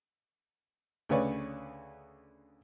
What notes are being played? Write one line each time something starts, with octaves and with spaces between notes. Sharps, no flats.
D2 C#3 B4 C#5 D5